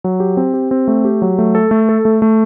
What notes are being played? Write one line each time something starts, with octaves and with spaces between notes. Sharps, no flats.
F#3
G4
C4
G4
C4
A3
G4
F#3
A3
A4
A3
A4
A3
A3